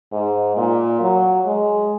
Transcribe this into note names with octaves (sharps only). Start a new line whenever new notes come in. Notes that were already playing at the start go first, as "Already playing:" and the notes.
G#2
A#2
F#3
G#3